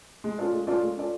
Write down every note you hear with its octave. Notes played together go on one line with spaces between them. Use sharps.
G#3
C#4 F4 A4 D5
G#3
C#4 F4 A4 D5
G#3
C#4 F4 A4 D5